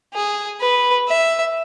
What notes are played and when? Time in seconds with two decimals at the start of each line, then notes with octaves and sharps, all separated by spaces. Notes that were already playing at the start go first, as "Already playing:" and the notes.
0.14 G#4
0.60 B4
1.08 E5